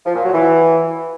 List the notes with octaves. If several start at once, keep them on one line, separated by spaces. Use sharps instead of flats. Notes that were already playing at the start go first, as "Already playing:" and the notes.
F3
A#2
F#3
E3